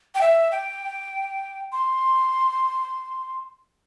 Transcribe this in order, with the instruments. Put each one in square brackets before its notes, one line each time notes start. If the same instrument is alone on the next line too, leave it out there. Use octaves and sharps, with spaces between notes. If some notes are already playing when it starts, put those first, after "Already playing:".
[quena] G5
E5
G5
C6